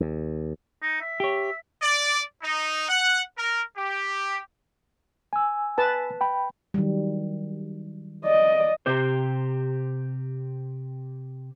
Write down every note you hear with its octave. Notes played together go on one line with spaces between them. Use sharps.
D#2
D#4
E5
G4 C#5
D5
D#4
F#5
A#4
G4
G#5 E6
B4 A5
G5 B5
D#3 F#3 G3
D5 D#5
C3 C4 G4 C5